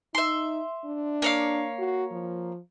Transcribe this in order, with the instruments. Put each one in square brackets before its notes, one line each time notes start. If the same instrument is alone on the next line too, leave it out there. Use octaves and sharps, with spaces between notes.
[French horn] D#4 [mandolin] E5 C6
[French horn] D4
[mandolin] A#3 C#5 F5
[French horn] F#4
F3